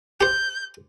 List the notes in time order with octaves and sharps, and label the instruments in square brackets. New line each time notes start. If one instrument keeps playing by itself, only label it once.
[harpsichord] G4 C5 [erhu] G6